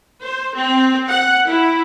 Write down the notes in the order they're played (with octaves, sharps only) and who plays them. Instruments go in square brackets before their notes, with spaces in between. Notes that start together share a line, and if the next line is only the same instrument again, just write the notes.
[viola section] C5
C4
F#5
E4